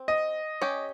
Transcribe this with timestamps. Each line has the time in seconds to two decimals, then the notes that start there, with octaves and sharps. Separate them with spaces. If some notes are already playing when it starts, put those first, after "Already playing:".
Already playing: C4
0.08 D#5
0.61 C#4 G4 C#5